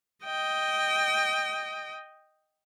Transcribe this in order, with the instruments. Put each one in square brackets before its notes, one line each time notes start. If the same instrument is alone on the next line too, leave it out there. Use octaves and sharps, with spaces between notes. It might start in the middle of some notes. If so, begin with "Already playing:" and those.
[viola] D#5 G5